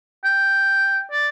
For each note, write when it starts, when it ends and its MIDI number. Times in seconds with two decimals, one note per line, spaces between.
0.24 1.03 79
1.11 1.27 74